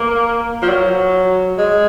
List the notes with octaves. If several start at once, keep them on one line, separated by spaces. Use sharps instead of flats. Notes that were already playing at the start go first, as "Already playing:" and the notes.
Already playing: A#3
F3
F#3
G#3